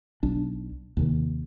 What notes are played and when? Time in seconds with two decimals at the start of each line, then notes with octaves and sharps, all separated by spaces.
0.23 B1 D4
0.97 D#2 C3 D#3